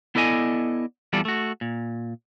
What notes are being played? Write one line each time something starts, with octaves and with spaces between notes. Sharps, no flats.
B3 E4 A4 D5 D#5 G#5
E2 G3 F4 A4 D5
A3 F#4
A#2